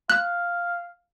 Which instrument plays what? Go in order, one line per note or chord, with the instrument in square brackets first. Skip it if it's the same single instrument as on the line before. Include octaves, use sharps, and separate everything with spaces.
[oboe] F5 [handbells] F#6